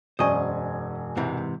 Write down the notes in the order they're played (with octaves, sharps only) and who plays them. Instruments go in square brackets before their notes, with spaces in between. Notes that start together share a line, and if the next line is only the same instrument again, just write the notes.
[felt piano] E1 F#2 G#5 [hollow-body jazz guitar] C5 D#5 [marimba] D5 C#6 D#6
[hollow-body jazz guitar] G#2 C3 E3